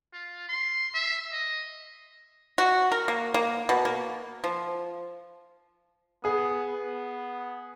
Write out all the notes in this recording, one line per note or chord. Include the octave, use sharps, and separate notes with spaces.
F4
C6
E5
D#5
F#4
A#4
A#3
A#3
B2
A#3
F3
B3 G#4 D#6
B3